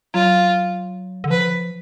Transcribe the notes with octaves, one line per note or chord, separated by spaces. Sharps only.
F#3 F4
D3
F3 B4